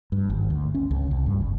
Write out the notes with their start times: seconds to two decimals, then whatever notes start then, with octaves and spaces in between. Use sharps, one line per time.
0.12 G2
0.30 G#1
0.50 D2
0.74 C#4
0.91 C#2
1.11 C2
1.26 G2
1.41 F#1